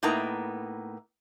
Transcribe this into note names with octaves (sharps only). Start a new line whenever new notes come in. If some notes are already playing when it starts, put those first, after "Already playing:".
A2 A#3 B3 D#4 A#5